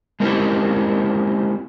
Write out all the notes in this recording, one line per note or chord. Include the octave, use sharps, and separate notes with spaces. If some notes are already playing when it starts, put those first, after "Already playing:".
G#3 A#3 C4 C#4 E4 G4